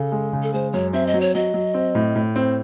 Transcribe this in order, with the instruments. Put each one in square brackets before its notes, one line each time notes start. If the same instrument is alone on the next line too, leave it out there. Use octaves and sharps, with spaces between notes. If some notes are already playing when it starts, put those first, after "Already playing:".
Already playing: [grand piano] C#3 [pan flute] A4
[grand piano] G#3
C#3
[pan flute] A4
[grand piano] G#3 [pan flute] C5
[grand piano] F#2 [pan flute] C#5
[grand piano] C4 [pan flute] E5
[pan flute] D#5
[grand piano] F#3
[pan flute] C#5
[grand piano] F#3 [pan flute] D#5
[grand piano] F#3
C4
A2
A2
C4